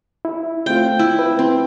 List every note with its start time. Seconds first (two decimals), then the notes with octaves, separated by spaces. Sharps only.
0.25 E4
0.66 A3 C4 F4 G5
0.99 E4
1.19 B4
1.39 C4